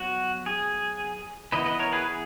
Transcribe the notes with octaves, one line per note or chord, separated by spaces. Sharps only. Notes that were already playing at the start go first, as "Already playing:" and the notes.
Already playing: F#3 B3 F#4
G#4
E3 B3 B4 D#5
B4 D#5
A#4 C#5
G#4 B4
G#4